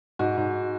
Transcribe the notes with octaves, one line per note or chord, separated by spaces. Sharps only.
G#2 F#4
G#2